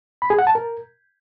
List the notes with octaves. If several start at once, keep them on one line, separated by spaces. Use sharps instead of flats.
B5
G#4
F#5
A5
A#4